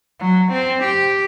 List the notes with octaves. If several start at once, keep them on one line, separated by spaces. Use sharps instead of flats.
F#3
C4
G4